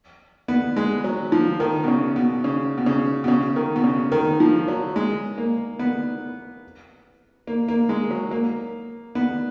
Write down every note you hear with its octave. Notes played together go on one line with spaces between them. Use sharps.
B3
G#3
F#3
F3
D#3
B2
C#3
B2
C#3
B2
C#3
B2
C#3
D#3
B2
C#3
D#3
F3
F#3
G#3
A#3
B3
A#3
A#3
G#3
F#3
A#3
B3